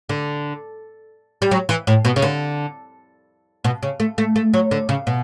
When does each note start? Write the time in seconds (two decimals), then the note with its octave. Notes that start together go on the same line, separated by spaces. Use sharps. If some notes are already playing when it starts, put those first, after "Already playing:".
0.09 D3
1.42 G3
1.51 F#3
1.69 E3
1.87 A2
2.05 B2
2.16 C#3
2.22 D3
3.64 B2
3.83 C#3
4.00 A3
4.18 A3
4.36 A3
4.54 F#3
4.71 D3
4.89 C#3
5.07 B2